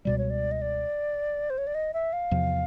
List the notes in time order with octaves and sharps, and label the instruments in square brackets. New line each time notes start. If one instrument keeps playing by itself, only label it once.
[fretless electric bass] C#2 B2 G3 [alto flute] D5
[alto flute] C#5
D5
D#5
D5
C5
C#5
D5
D#5
E5
F5
[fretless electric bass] E2 C3 F3